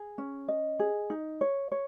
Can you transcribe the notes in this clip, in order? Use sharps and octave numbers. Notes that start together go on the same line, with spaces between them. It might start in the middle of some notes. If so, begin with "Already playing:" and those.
Already playing: G#4
C#4
D#5
G#4
D#4
C#5
C#5